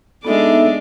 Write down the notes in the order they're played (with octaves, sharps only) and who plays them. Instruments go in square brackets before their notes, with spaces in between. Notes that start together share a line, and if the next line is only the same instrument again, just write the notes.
[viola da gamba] G#3 D4 D5 [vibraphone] B3 D#4 E5 [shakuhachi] A4